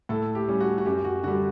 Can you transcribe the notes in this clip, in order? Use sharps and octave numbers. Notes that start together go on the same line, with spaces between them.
A2 A4
G4
G3 C#4
F#4
F#4
F#2 G4
F#4
D3 G3 F#4